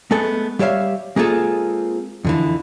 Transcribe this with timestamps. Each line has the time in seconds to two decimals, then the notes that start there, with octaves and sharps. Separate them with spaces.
0.11 G#3 A3 B3 A4
0.59 G3 G4 C#5 E5 F5
1.16 G#3 A#3 C4 F4 G#4 A4
2.25 F2 D3 E3